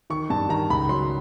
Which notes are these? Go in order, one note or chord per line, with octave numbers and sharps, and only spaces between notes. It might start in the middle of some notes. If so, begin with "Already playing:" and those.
D#3 C#6
G2 A5
D#3 A#5
C#2 B5
F#3 C6